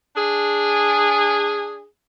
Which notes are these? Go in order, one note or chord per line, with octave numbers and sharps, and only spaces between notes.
D4 G#4